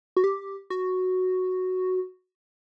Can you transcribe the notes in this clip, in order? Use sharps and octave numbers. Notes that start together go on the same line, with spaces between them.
F#4
G4
F#4